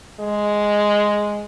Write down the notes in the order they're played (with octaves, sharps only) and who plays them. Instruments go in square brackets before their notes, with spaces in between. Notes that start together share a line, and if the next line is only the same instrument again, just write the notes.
[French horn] G#3